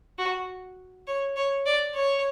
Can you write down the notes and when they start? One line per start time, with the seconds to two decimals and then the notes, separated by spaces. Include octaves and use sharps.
0.18 F#4
1.07 C#5
1.37 C#5
1.66 D5
1.95 C#5